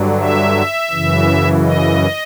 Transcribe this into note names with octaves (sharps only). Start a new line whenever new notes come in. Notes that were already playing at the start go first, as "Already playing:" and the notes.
Already playing: G2 D3 F#3
E5
F#2 C#3 E3
D#5